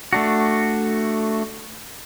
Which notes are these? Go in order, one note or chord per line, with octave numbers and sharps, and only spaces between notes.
A3 D4 F#4